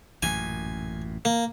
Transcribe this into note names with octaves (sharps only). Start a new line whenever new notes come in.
A1 F#2 A#2 G#5
A#3